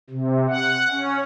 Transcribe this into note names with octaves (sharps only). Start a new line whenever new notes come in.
C3
F#5
C#4